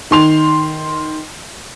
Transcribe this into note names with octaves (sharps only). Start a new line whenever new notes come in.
D#3 C6 F7